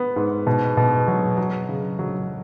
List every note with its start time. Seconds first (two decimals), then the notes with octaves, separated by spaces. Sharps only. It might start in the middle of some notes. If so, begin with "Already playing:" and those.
Already playing: B3
0.16 G#2
0.47 B2
0.77 B2
1.08 F#3
1.38 F#3
1.69 C#3
1.99 F#3